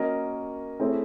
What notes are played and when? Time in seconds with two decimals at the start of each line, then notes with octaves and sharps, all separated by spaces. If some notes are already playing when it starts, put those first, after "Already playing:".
Already playing: A#3 C#4 F#4 A#4 D#5
0.80 A3 C4 E4 G#4 C#5